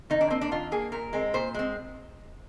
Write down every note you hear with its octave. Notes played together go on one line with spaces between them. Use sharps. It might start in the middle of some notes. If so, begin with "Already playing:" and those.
D#3 D#4
D4
A#3 C4
D4
D#3 F4
A#3 G#4
A#2 A#4
G#3 C4
A#2 C5
G#3 C4